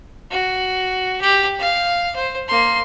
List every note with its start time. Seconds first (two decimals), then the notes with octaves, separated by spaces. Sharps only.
0.31 F#4
1.21 G4
1.59 F5
2.16 C5
2.48 A#3 C6